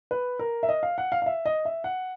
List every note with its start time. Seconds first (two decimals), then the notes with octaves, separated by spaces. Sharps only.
0.11 B4
0.39 A#4
0.63 E5
0.69 D#5
0.83 F5
0.98 F#5
1.12 F5
1.22 F5
1.26 E5
1.46 D#5
1.65 E5
1.84 F#5